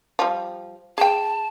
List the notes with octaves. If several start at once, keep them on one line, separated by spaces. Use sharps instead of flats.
F3 G3
G#4 G5 A5